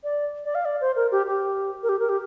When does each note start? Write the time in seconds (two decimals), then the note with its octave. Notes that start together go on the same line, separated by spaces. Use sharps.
0.04 D5
0.45 D5
0.55 F5
0.65 D5
0.81 C5
0.96 A#4
1.12 G4
1.27 G4
1.83 A#4
1.89 G4
1.99 A#4
2.09 G4